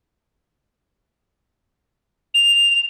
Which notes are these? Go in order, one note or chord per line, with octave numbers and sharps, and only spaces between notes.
F7